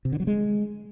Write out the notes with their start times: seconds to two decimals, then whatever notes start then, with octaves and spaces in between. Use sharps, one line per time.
0.05 C3
0.12 D3
0.20 F#3
0.27 G#3